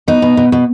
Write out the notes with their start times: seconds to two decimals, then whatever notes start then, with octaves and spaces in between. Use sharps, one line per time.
0.08 B2 D#4
0.22 B2
0.37 B2
0.52 B2